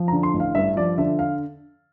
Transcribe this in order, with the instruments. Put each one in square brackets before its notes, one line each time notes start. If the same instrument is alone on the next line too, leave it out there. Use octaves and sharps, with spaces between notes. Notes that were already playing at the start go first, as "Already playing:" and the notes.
Already playing: [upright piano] F3
D3 A#5
C6
A1
F5
G2 E5
F3 D5
D3 E5
F5